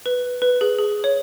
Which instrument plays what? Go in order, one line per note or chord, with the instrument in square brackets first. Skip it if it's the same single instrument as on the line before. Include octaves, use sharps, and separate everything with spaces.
[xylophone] B4
B4
G#4
G#4
C#5